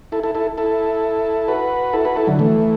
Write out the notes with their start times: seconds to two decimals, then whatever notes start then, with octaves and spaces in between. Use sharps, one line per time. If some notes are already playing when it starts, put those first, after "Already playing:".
0.12 E4 A4
0.23 E4 A4
0.35 E4 A4
0.58 E4 A4
1.48 F#4 B4
1.93 E4 A4
2.05 F#4 B4
2.16 E4 A4
2.27 D3 F#3
2.39 E3 A3